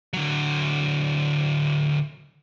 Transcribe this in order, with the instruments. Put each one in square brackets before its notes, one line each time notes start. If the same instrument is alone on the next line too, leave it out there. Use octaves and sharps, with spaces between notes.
[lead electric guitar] D3 F#3